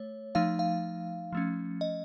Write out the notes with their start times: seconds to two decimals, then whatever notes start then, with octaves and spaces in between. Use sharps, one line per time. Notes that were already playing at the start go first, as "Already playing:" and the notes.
Already playing: A3 C#5
0.35 F3 A3 D#4 F5
0.59 F5
1.32 F3 A3 C#4
1.81 D#5